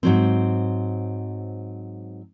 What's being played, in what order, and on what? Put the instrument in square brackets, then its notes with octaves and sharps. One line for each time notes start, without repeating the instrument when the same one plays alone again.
[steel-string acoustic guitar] G#2 F#3 C4